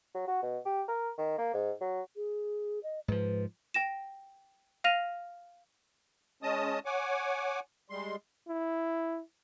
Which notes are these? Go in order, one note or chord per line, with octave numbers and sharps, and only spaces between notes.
F#3
F#4
B2
G4
A#4
D#3
A#3
G#2
F#3
G#4
D#5
G#2 F3 B4
G5 A#6 E7
F5 F6 A#6 D#7 F7
G#3 C#4 D#5 A5 D#6
C#5 F#5 G#5 D6
G3 G#3 C6
E4